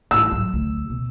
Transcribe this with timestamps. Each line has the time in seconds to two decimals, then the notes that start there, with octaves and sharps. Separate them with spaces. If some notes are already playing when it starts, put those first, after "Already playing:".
0.11 A1 G2 E6
0.32 F#3
0.53 D2
0.90 B2